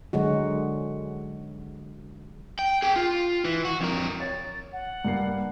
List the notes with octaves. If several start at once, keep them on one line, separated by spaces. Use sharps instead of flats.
D3 F#3 G#3 F#4
G5
G#4 G5
F4
E3
F#4
F2 A#4
C#5 A6
F#5
G2 A#3 C7